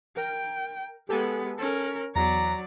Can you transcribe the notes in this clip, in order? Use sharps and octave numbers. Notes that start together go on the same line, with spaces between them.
A#4 G5
G#3 B3 G4 A4 G#5
C#4 A4 A#4
E2 F#3 D5 A#5